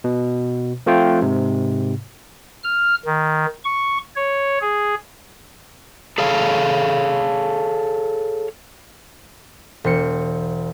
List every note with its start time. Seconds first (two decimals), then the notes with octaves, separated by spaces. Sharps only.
0.04 B2
0.86 F3 A3 C4 F4 G5
1.22 G#2 C3
2.64 F6
3.05 D#3
3.64 C#6
4.16 C#5
4.61 G#4
6.18 G#4 A4 C#5 F5
9.84 E1 C5 C#7